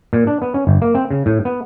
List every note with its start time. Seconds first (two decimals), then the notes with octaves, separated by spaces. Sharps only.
0.13 A#2
0.27 D4
0.42 B3
0.54 C#4
0.67 G1
0.82 A#3
0.95 C4
1.10 C#3
1.26 A2
1.45 B3